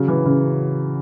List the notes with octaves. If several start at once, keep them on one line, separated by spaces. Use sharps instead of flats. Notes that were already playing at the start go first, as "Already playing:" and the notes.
Already playing: C#3 F#3
E3
C#3